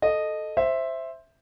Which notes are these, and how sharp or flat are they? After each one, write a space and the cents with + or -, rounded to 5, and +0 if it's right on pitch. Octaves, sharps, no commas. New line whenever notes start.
A4 -5 D#5 -10
C5 +5 E5 +0